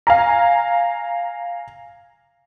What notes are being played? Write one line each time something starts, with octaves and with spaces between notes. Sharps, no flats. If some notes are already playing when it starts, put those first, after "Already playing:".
F5 G#5 A#5